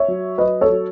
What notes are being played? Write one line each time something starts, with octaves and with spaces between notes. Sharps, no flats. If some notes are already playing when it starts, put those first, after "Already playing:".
Already playing: C#5 E5
F#3
F#3 B4 D#5
A4 C#5
F#3